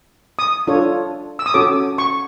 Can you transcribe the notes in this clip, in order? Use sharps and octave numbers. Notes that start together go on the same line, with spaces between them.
D#6
D4 F4 A4 C#5
E6
D#6
C#4 F#4 A4 C#5 D6
C#6